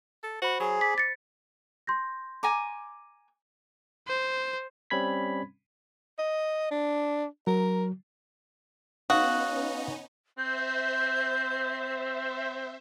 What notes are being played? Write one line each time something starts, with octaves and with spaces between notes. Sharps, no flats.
A4
F#4 C5 B5
F#3 G#4
D5 B6
A6 C#7
C6 G6 A#6
G#5 A#5 D6
C5
G3 C4 C#4 B5 G#6 B6
D#5
D4
F#3 A#4
B3 C#4 D#4 F#4 F5 D#6
C4 C5 E5 G6